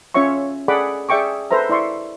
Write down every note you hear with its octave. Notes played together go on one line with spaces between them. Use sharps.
C#4 F4 C#5 E5 C#6
G#4 A4 D5 F#5 B5 D6
G#4 D5 E5 G5 C#6 D6
A4 B4 C5 E5 A#5
E4 D5 E5 C6 C#6